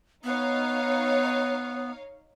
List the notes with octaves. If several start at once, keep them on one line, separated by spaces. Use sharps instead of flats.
B3 D#4 C#5 F5